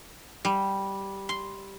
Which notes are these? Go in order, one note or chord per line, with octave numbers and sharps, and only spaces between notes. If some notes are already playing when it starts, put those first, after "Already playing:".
G3
C6